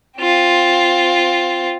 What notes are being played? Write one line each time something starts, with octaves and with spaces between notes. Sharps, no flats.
C4 F4